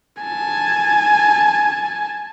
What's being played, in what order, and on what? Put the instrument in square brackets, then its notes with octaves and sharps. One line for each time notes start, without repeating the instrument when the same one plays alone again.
[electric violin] G#5 A5